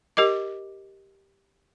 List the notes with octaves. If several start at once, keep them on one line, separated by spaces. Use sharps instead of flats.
G4 A#4 D#5 D6